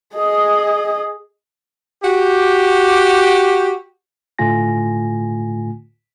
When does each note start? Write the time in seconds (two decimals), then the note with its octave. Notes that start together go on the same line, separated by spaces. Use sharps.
0.16 G#4 D#5
2.03 F#4 G4
4.39 A2 D3 A3 F4 G#5 A#6